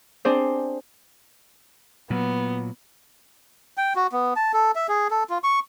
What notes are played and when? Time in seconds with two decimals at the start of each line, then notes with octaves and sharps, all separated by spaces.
0.25 C4 D4 G#4 C5
2.10 A#2 F#3 B3
3.77 G5
3.96 F#4
4.12 B3
4.36 A5
4.53 A4
4.75 E5
4.88 G#4
5.11 A4
5.29 F4
5.44 C#6